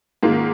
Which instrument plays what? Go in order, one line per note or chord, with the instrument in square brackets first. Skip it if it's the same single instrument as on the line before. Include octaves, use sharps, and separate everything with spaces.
[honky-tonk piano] G#2 D#3 A#3 F4